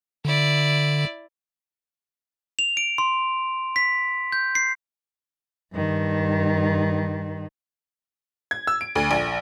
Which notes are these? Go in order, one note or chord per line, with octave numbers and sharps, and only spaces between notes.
D3 E4 D5
F7
D7
C6
B6
G6
C7
G2 D#3
G#6
E6
D7
D2
A#1